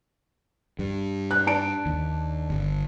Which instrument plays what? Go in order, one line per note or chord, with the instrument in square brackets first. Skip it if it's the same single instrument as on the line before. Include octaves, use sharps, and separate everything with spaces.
[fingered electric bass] G2
[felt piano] F#6
D4 A5 D7
[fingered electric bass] D#2
G1